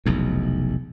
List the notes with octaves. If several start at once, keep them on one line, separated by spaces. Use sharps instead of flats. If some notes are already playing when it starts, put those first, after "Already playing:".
F1 B1 E2